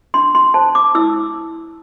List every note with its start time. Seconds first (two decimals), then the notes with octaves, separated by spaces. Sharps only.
0.14 D4 C6
0.35 C6
0.54 C5 A5
0.75 D6
0.95 E4 E6